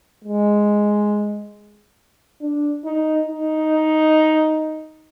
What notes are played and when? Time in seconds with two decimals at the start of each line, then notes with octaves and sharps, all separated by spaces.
0.24 G#3
2.41 D4
2.85 D#4
3.28 D#4